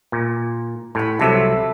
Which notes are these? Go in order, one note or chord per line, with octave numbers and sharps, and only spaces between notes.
A#2
A2 G#5 B5
C2 C3 F#3 A4 E5 A5